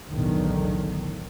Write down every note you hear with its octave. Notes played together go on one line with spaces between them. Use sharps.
B1 E2 A2 D3 D#3